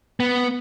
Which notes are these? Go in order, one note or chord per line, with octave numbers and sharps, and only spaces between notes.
B3